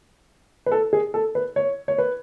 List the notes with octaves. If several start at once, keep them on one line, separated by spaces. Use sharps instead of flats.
B4
A4
G#4
A4
B4
C#5
C#5
B4